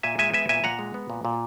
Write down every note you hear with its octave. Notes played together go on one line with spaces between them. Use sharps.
A#2 E5 G#5
G#3 E5 G#5
B3 E5 G#5
A#2 E5 G#5
A#2 F#5 A#5
G#3
B3
A#2
A#2